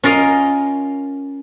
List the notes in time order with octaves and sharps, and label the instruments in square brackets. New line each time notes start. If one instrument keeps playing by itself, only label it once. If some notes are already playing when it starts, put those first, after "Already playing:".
[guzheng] C#4 F4 A#4 D#5